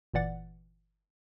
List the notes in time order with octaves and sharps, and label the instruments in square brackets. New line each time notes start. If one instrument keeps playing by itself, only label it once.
[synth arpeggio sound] G1 A#2 E3 D5 F#5 A6